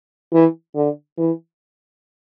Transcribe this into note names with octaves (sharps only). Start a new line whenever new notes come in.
E3
D3
E3